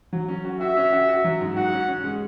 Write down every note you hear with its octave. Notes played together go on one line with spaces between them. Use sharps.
F#3
C#4
F#4
F#4 E5
C#4
F#4
F#4
F#3
G#2
F#4 F#5
C#4
C#4
G#3